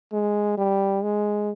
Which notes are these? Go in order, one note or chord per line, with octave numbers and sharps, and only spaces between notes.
G#3
G3
G#3